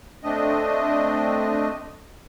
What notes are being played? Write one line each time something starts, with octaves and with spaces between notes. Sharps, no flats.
A3 C4 D4 D#5